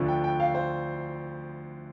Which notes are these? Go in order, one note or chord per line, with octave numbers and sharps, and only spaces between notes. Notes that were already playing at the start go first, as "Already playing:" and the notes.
Already playing: D2 D3 F3
G5
G5
F5
C5